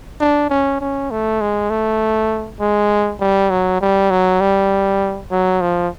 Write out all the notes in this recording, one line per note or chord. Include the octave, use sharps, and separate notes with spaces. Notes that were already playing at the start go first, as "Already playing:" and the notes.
D4
C#4
C#4
A3
G#3
A3
G#3
G3
F#3
G3
F#3
G3
F#3
F3